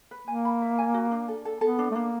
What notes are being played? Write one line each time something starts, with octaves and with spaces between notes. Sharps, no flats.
B4
A#3 G#5
B5
E5
G#5
F#4
D4
A4
A4
B3 A4
D4
A3
A#3 D4